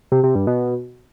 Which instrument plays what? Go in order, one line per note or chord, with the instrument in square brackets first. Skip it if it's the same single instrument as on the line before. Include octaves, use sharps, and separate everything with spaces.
[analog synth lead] C3
C3
G2
B2